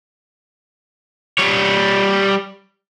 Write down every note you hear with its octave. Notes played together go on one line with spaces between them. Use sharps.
G3 C#5